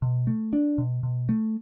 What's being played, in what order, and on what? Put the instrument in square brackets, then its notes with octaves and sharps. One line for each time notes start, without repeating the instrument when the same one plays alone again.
[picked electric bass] B2
A3
D4
B2
B2
A3